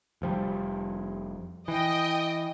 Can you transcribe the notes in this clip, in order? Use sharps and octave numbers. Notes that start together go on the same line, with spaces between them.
F1 F3 G3
E3 D#5 G5